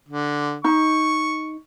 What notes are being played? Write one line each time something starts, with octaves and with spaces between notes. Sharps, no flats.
D3
D#4 C#6